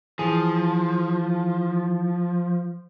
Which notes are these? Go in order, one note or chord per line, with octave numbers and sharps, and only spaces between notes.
E3 F3 G#4